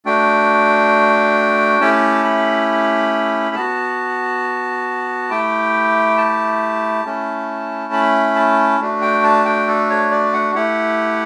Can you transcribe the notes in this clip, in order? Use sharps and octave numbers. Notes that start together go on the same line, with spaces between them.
A3 D4 F#4 G5
A3 C#4 E4 G4 A5
B5
B3 F#4 A5
A3 E4 G4 G5
A5
A3 C#4 E4
B5
A5
A3 D4 F#4
G5
A5
G5
A4
C#5
D5
F#5
A3 E4 G4 F#5